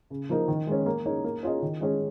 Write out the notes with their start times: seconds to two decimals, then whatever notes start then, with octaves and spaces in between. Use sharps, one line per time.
0.10 C#3
0.29 F3 A#3 D#4 A#4
0.48 D#3
0.67 G#3 C#4
0.86 A#3
1.06 D#4 G#4 C#5
1.24 A#3
1.43 C#4 F4 G#4 D#5
1.62 D#3
1.81 G#3 C#4 G#4